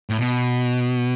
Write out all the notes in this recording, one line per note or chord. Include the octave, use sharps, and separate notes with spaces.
A2
B2